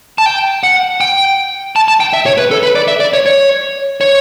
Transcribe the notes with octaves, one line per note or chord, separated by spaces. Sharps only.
A5
G5
F#5
G5
A5
A5
G5
E5
C#5
B4
A4
B4
D5
E5
D5
C#5
C#5
C#5